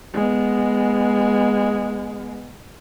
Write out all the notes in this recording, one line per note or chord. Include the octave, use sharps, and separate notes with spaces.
G#3 B3